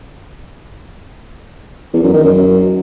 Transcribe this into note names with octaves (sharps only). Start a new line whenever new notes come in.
E2
F#2
D#3
F#2